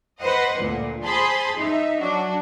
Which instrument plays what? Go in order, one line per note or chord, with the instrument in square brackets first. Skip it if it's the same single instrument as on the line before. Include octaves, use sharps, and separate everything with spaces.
[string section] B4 C5 D#5 F#5
D2 A#2
G#4 C5 A5 B5 C6
D#4 E5
F#3 D4 F#4